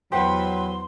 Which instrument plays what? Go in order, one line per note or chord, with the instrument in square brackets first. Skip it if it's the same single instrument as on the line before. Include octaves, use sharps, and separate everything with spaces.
[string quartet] E2 B4 [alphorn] F#3 [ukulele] G4 C5 F#5 [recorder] C6